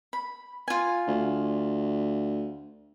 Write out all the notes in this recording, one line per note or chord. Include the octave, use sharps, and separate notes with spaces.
B5
F4 G#5
D2